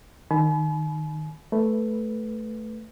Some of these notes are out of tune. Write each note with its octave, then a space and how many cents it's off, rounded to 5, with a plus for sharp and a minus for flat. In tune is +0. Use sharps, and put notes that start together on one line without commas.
D#3 -15 G#5 +45 B5 +0
A3 -5 B4 +0